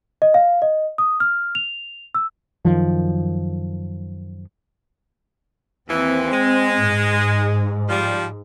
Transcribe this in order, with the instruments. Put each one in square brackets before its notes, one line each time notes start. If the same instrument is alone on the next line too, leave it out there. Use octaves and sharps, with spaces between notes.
[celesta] D#5
F5
D#5
D#6
F6
F7
E6
[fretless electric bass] F#2 D#3 F3
[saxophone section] D#2 E3 [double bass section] C4
[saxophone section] G#3
[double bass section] G#2
[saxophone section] F3 G3